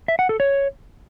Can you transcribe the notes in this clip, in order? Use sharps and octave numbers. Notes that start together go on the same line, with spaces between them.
E5
F#5
A4
C#5